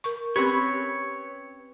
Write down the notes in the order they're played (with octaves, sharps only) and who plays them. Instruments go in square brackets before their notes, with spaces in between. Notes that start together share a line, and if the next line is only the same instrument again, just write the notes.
[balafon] A#4 C#6
[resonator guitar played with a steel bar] C4 C#4 B4 [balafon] G4 [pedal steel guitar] C#5